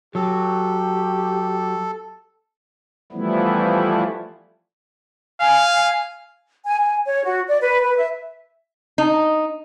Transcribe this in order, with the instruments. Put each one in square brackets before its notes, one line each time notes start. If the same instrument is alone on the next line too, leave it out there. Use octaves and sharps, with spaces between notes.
[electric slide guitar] F#3 [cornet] G4 [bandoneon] A4
[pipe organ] E3 F3 G3 A3 B3 E4
[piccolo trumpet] F5 [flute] G#5
[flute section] G#5
G#5
C#5
F#4
D5
B4
B4
E5
[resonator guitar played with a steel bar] D#4